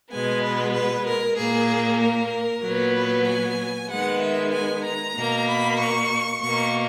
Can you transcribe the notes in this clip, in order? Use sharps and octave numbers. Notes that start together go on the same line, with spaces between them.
B2 G#3 B3 G#5
B4
B4
A#4
A#2 A#3 G#4
A#4
A#2 F#3 B3
B4
G#5
D#3 G#3 B3 F#5
E5
G#5
A#5
B2 A#3
B5
C#6
B2 A#3 C#6